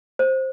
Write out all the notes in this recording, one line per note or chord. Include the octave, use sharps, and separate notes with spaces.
C5